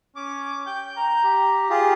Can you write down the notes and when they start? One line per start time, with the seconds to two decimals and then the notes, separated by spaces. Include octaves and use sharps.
0.16 C#4 D6
0.67 G5 G6
0.97 A#5
1.24 G4
1.70 F4 G4 G#4